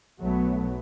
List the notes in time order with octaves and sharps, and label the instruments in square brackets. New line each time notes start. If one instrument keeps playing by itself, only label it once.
[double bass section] B1 F#3 A3 B3